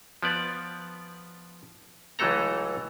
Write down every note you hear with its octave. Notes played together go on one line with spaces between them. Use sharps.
F3 B3 D5
C#2 E3 F#3 A3 A4 A#5